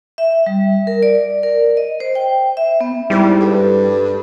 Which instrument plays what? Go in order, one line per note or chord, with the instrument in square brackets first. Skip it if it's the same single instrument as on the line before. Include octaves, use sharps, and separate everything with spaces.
[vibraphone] E5
G3
A#4
D5
A#4
D#5
C5
G5
E5
B3
[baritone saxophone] G#2 [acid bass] G3 [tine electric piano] E4
[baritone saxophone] G2 [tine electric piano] A4 B4